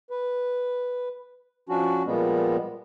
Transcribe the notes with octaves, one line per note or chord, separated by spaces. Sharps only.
B4
F3 C#4 D4 F#4
A#2 F3 G3 G#3 B3